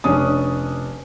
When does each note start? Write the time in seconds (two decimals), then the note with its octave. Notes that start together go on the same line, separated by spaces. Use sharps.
0.04 F1 C#4 D4 D#6